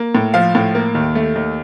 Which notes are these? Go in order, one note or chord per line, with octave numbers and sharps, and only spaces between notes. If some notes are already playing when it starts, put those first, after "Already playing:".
Already playing: A#3
A2
F3 F5
A2
A#3
D#2
A3
D#2